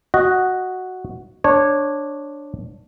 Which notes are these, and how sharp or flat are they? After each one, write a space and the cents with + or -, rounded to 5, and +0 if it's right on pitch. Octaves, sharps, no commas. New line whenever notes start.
F#4 +0 D#5 +0
D4 +0 C#5 -15